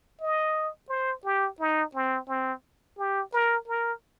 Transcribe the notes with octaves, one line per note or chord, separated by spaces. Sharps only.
D#5
C5
G4
D#4
C4
C4
G4
A#4
A#4